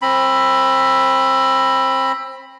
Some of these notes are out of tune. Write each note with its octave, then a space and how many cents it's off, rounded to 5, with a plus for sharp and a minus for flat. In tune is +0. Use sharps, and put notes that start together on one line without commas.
C4 +25 B5 +0